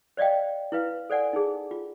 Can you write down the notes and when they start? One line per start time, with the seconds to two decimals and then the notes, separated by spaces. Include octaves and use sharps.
0.17 C5 D5 D#5 F5 G5
0.72 E4 B4 F5
1.10 A4 C5 D5 F#5 G#5
1.33 D#4 G#4
1.71 F4